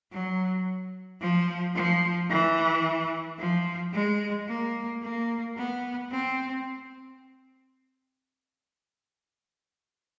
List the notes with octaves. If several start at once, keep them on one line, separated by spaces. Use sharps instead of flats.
F#3
F3
F3
E3
F3
G#3
A#3
A#3
B3
C4